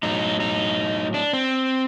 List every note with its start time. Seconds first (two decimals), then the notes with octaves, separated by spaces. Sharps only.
0.03 A2 F#3 D#4
0.40 D#4
1.14 D4
1.33 C4